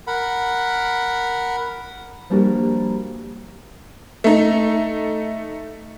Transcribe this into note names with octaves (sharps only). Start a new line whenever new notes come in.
A#4 F#5 B5
F3 G3 A#3 D4 F#4 G4
A3 D#4